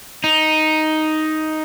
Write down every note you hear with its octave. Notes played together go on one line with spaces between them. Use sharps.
D#4